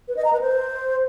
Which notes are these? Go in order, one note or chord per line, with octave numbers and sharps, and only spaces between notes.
B4
D#5
A#5
B4
C5